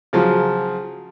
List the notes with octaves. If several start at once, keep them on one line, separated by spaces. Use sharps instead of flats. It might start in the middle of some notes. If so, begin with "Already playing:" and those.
C#3 F3 F#3